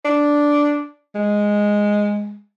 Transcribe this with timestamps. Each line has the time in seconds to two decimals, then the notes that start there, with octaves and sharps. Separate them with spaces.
0.05 D4
1.15 G#3